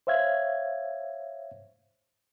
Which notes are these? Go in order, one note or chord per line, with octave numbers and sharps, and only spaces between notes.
C5 C#5 E5 F5 G#6